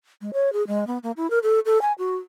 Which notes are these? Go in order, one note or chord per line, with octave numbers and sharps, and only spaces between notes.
G#3
C#5
G#4
G#3
B3
A#3
E4
A#4
A4
A4
G#5
F#4